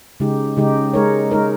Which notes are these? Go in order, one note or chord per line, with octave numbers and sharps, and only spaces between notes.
C#3 G#3 D#4 G4
C#3 G#3 D#4 G4
G#3 D#4 A#4 C#5
G#3 D#4 A#4 C#5